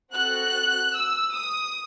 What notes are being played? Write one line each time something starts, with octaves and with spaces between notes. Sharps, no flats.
C4 F#4 A4 F#6
E6
D#6